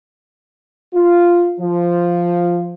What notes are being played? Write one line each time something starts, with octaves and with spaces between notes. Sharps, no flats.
F4
F3